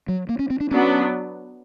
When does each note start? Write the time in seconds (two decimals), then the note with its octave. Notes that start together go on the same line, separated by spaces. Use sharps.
0.08 F#3
0.29 A#3
0.39 C#4
0.50 C4
0.60 D4
0.71 F#3 B3 C#4 D4